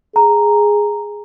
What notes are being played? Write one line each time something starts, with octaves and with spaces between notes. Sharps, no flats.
G#4 A#5